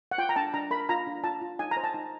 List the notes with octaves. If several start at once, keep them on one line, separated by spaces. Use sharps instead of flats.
F#5
F4 G5
A#5
D4 A5
D4 A#5
A#4 B5
F4 A#5
D4
F4 A5
F4
D#4 G#5
A#5
C5
A5
D#4